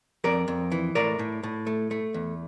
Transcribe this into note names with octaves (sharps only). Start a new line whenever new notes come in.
F2 A#4 D5
F2
E3
A2 A#4 D5
A2
A2
A3
A3
E2